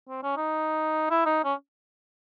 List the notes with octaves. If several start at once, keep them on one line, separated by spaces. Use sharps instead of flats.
C4
C#4
D#4
E4
D#4
C#4